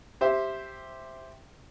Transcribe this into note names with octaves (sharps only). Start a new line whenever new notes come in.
G4 C5 E5